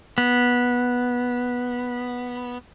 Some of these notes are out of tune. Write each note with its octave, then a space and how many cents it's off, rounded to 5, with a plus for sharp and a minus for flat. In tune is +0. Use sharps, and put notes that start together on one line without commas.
B3 -10